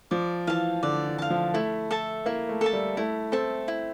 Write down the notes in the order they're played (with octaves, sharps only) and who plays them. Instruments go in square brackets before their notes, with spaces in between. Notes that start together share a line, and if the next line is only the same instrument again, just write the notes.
[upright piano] F3 [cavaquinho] D5
[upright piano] E3 [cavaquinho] F5 A5
[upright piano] D3 [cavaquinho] D5
[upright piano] E3
[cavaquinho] F5 A5
[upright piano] F3
[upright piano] A3 [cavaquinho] E4
[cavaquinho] A4 E5 A5
[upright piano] A#3 [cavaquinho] E4
[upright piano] A3
[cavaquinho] A4 E5 A5
[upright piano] G3
[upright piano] A3 [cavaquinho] E4
[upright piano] C4 [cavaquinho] A4 E5 A5
[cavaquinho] E4